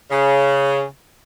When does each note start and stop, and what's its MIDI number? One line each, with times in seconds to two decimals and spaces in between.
0.10 0.84 49